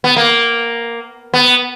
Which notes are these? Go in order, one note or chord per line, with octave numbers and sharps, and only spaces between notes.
B3
A#3
B3